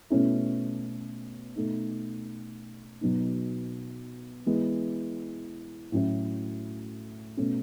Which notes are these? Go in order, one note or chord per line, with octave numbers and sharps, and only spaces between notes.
B2 A3 C#4 E4
B2 A3 D#4
B2 F#3 B3 D#4
E3 G#3 B3
A2 F#3 C#4 E4
B2 A3 C#4